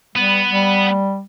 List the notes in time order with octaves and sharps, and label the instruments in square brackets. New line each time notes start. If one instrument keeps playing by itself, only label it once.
[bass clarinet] G3 [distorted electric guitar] B3
[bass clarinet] G3